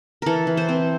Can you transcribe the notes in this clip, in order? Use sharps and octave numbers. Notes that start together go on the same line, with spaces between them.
E3 A4 A#4
E3
C5
C4